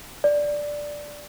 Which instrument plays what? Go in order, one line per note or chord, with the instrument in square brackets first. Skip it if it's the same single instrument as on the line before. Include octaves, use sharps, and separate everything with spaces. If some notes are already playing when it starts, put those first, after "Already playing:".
[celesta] D5